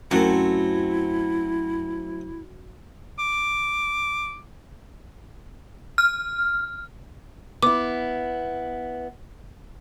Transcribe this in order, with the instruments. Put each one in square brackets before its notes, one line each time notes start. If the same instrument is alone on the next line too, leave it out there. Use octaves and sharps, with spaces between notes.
[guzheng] F#2 [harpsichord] F#3 A3 C4 [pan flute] E4
[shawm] D6
[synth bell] F6
[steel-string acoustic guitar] B3 E4 [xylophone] D6